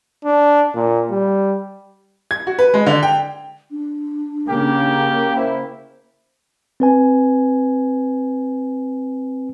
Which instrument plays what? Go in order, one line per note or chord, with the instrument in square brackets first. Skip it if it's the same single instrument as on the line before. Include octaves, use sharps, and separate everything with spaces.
[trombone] D4
A#2
G3
[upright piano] G#6
F#4
B4
G#3
D3
G5
[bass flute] D4
[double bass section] C#3 A#3 [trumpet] G4
[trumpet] E4 [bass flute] C5
[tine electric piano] C4 B4 G#5